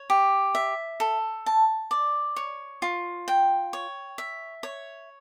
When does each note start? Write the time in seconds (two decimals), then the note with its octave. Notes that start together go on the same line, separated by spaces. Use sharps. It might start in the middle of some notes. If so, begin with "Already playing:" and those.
Already playing: C#5
0.10 G4
0.55 E5
1.00 A4
1.46 A5
1.91 D5
2.36 C#5
2.82 F4
3.28 G5
3.73 C#5
4.18 E5
4.63 C#5